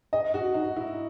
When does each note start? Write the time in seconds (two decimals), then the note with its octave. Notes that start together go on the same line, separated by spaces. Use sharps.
0.13 D#5
0.34 F#4
0.54 D#4
0.76 E4